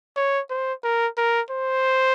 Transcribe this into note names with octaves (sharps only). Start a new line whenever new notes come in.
C#5
C5
A#4
A#4
C5